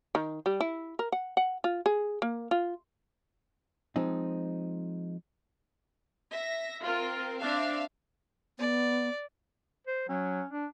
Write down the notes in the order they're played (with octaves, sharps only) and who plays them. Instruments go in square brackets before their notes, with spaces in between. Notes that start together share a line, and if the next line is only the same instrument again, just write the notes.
[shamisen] D#3
G3
E4
A#4
F#5
F#5
F4
G#4
A#3
F4
[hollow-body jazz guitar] F3 G#3 C4 D#4
[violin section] E5 A#6
[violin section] C4 A#4 [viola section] F4
[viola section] C4 D4 [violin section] E5 F5
[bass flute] B3 [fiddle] D5
[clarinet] C5
[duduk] F#3 [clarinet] C#4
[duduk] D4